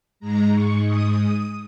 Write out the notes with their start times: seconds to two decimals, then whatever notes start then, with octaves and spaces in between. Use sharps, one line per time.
0.20 G#2 G#3 A#5
0.52 C#6
0.86 D#6